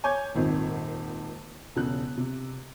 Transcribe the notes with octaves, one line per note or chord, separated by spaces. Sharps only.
C#5 G#5 C#6 D6 G6 G#6
D#1 G#1 F2 D#3
E1 C#3 F#6
C3